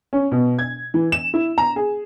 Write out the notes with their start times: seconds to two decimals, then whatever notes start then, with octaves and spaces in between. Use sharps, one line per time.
0.13 C#4
0.32 B2
0.59 G#6
0.94 E3
1.12 E7
1.34 E4
1.58 A#5
1.76 G#4